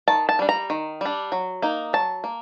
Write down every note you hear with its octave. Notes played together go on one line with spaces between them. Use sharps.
D#3 A5
A5
G3 D4
A#5
D#3
G3 D4
F#3
A#3 D#4
F#3 A5
A#3